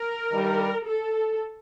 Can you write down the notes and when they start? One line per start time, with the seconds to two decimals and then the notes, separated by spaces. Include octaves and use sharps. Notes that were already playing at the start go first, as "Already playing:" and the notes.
Already playing: A#4
0.31 G2 D#3 G3
0.86 A4